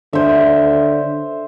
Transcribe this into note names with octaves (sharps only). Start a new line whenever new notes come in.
D3 C5 E5